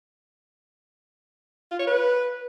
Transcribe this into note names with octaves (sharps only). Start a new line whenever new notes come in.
F4
C#5
B4